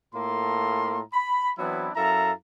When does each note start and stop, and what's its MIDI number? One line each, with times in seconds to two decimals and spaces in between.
0.15 1.02 45
0.15 1.02 58
0.15 1.02 65
0.15 1.02 69
0.15 1.02 82
0.15 1.02 84
1.13 1.51 83
1.59 1.90 52
1.59 1.90 54
1.59 1.90 59
1.59 1.90 60
1.59 1.90 62
1.59 1.90 64
1.96 2.32 42
1.96 2.32 64
1.96 2.32 69
1.96 2.32 77
1.96 2.32 82